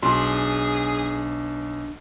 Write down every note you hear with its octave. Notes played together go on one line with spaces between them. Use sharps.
B1 D4 F#4 G#4